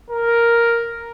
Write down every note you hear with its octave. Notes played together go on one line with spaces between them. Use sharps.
A#4